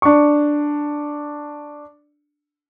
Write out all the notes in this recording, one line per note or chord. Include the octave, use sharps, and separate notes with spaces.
D4 C#6